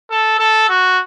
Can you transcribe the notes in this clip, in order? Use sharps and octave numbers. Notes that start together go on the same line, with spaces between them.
A4
A4
F#4